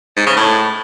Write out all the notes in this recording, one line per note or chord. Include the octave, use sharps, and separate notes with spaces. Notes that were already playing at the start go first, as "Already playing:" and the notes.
G#2
C#3
A2